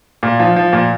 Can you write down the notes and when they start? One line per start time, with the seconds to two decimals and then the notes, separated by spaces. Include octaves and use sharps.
0.23 A#2
0.39 F3
0.56 F3
0.73 A#2